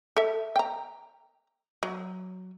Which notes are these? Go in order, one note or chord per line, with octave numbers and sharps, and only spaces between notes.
A4 E5
G5 A#5
F#3